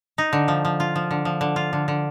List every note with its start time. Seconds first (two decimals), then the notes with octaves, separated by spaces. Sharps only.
0.18 D#4
0.33 D3
0.48 F3
0.65 F3
0.80 F4
0.96 F3
1.11 D3
1.25 F3
1.41 D3
1.56 F4
1.73 D3
1.88 D3